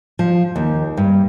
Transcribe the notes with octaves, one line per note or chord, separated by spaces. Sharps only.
F3
D#2
G2